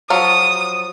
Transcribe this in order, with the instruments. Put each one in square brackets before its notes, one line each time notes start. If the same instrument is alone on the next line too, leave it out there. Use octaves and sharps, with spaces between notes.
[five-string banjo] F3 F#3 F4 [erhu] D#6